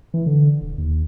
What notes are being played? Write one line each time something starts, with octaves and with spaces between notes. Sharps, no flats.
E3
D3
D#1
D#2